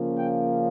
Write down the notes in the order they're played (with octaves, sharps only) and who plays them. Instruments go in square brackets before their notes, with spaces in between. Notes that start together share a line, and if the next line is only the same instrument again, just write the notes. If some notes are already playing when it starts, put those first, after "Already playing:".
Already playing: [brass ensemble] C#3 F3 A#3 C#4 F4
G5